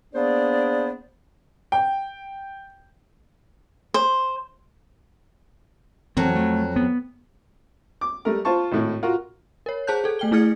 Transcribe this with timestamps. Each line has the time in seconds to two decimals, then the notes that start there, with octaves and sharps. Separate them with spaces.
0.14 A#3 B3 D4 G#4 C5 D5
1.72 G5
3.94 C5
6.17 F2 E3 F#3 C4 F#4
6.35 A3
6.76 B3
8.01 D6
8.25 G3 A3 A#4
8.45 F4 C5 A5 C#6
8.72 G#1 A2 E4
9.03 F4 F#4 A#4
9.66 A#4 C#5
9.87 G#4 C5 A5 F#6 G6
10.04 G#4 A4
10.19 A3 G5 G7
10.31 A3 E4 G#4 F6 G#6 C#7